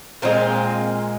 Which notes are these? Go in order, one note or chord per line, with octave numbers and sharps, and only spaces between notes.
A#2 F3 G#3 C4 F4